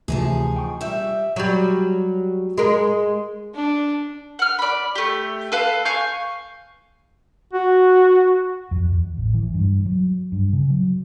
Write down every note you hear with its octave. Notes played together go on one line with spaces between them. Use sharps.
D2 C3 E3 F3 D#4 G#4
G5 C#6
G3 E5 E6 G6
F#3 G3
G#3 A#4
D4
F#5 F6
D5 B5
A3 G4
A4 B4 F5
F5 G#5 C#6 G6
F#4
F2
E2
A1
E3
G2
F#3
G2
C#3
F#3